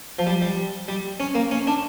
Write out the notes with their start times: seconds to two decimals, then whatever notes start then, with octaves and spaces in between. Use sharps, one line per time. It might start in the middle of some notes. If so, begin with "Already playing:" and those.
0.19 F3
0.26 G3
0.42 G3
0.88 G3
1.20 C#4
1.35 A#3
1.51 C#4
1.67 D4